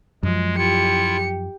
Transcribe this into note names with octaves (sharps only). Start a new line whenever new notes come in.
F#2 F3 G#3
E4 F4 G4 C#7